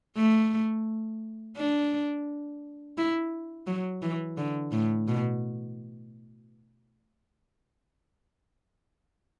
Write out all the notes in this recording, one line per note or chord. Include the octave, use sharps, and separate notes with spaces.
A3
D4
E4
F#3
E3
D3
A2
B2